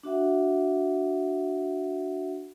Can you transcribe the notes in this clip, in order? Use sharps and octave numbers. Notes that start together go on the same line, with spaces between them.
D4 F#4 E5 F#5